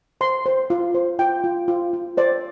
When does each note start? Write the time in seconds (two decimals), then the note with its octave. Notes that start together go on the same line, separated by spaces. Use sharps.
0.21 C5 C6
0.46 C5
0.70 F4
0.95 C5
1.19 F4 G5
1.44 F4
1.68 F4
1.93 F4
2.17 C5 D5